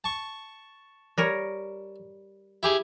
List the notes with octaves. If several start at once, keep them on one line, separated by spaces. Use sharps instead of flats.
A5 C#6
G3 A#4 C#5
E4 G4 G#4